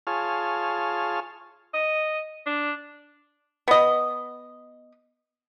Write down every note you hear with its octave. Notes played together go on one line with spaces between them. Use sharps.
F4 G#4 C#5 A5 F6
D#5
D4
B3 D#5